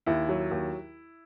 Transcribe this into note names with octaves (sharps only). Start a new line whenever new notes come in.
D#2 E4
F#3
D#2